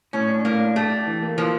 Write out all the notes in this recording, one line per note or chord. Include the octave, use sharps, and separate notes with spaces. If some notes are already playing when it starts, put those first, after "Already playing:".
A2 C#4
D4
A2 A#3
D4
A3 G4
G4
E3
A#3
E3 F3